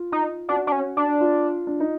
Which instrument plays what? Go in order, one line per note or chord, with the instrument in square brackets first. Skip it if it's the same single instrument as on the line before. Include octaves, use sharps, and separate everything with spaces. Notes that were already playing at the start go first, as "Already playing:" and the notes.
Already playing: [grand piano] F4
[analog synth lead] D#4
[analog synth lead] D4 [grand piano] F#4
[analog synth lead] D4
C#4
D4
[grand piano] F4
D4
D#4